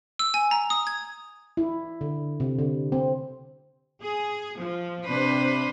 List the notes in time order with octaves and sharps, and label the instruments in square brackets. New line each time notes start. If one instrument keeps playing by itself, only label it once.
[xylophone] E6
G#5
A#5
D#6
G#6
[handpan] E4
D3
C3
D3
C4
[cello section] G#4
F3
C3 D4 B4 C5